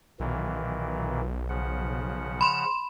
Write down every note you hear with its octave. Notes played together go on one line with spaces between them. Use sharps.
B1 A#2 D#3 E3
C#3 F3 F#5
B5 C6 E7